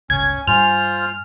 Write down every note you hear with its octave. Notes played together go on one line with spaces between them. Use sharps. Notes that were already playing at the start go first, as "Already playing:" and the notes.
G1 C#2 C#4 G#6
G2 G3 F4 C5 G#5 F6